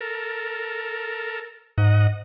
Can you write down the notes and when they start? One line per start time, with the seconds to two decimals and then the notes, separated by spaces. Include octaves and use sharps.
0.01 A4 A#4
1.78 G#2 D#5 F#5